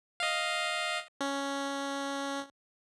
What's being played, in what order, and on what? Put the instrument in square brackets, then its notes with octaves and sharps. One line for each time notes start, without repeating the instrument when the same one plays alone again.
[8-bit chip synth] D#5 F5
C#4